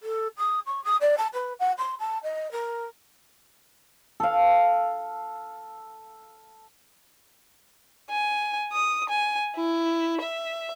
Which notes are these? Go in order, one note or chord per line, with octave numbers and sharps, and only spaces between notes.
A4
D#6
C#6
D#6
D5
A5
B4
F#5
C6
A5
D#5
A#4
A4 F5
G#5
D#6
G#5
E4
E5